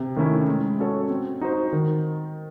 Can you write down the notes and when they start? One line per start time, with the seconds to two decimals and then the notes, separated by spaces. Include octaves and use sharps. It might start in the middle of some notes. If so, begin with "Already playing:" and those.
Already playing: C3
0.16 D#3 A3 C#4 E4
0.48 G#3
0.79 C#4 F#4 A4 C#5
1.10 C4
1.41 D#4 F#4 C5
1.73 D#3